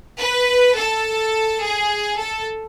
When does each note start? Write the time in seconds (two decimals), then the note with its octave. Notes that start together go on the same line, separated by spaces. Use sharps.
0.20 B4
0.76 A4
1.62 G#4
2.18 A4